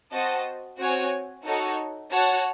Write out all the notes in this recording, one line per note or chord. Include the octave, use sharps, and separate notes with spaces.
C4 F#4 C5 D#5 A5
C4 F#4 C#5 G#5
D#4 F#4 A4 C#5
F#4 C#5 F#5 A5